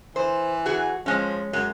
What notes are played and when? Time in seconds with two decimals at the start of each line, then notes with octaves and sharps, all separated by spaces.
0.16 E3 C5
0.66 F#4 G#4
1.06 F3 G#3 C#4
1.53 F#2 G#3